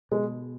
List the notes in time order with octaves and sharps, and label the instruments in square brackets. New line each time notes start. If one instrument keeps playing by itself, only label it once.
[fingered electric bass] B2 [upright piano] G#3